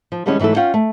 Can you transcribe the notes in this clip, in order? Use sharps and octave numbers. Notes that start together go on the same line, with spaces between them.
F3
D3 E3 G3 G#3 B3 C#4
G#2 E3 F#3 A3 A4
C#4 F4 F#5 G5
A3